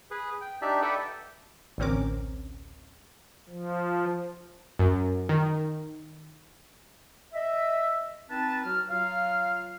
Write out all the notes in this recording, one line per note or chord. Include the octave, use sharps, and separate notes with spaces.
G#4 B4
G5
D4 D#4 G4 D5 E5
A4 B4 D5 E5 F#5 G5
A1 D2 C4 C#4 A#4 D6
F3
F#2
D#3
D#5 E5
C4 D#4 B4 A5
F#3 F#4 F6
F#3 F4 F5